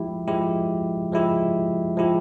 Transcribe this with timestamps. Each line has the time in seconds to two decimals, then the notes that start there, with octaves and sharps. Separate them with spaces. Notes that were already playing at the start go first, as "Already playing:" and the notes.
Already playing: F3 G#3 E4 G4
0.28 F3 G#3 E4 G4
1.12 F3 G#3 E4 G4
1.97 F3 G#3 E4 G4